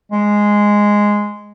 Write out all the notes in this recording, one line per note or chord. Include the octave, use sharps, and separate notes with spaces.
G#3